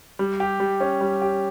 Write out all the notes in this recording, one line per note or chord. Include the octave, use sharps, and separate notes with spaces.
G3
G4
G3
C#4
G3
G4